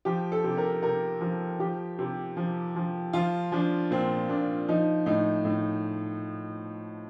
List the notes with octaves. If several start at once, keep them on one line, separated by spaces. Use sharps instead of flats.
F3 G4
A4
C3
A#4
C3 A#4
F3
F3 G4
C3
F3
F3
F3 F4
F3 D4
A#2 C4
A#2 D4
F3 D#4
A2 D#4
A2